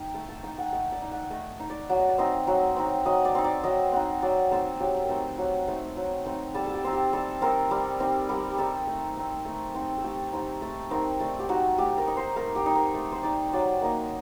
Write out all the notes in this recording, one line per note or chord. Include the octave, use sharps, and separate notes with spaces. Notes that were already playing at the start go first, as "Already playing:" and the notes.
Already playing: D#4 G5
A3 A5
A5
D#4 G5
F#5
A3 D#5
D5
D#4
F#5
D5
A3 D#5
D#4
D5
F#3 F#5
D#5
D5
C4 D#4 D#5
F#3
C4 D#4
F#3 D#5
D5
C4 D#4
D5
F#3 D#5
C4 D#4 F#5
F#3 D5
A3 C4 D#4 A4
F#3 G4
A#4
A3 C4 D#4 A4
F#3
A3 C4 D#4
F#3
A3 C4 D#4
G3 A4
A4
G4
C4 D#4
G4
G3 A4
C4 D#4 A#4
G3
C4 D#4
G3 A#4
C4 D#4 A4
A3
C4 D#4
A3
C4 D#4
A4
A3 G4
C4 D#4 G4
A3
C4 D#4 A#4
A3 D5
G4
D#4 F#4
A3 G4
A#4
D#4
C5
A3 A#4
G4
D#4
A#4
A3
C5
D#4 D5
F#3 D5
A#3 D#4 D#5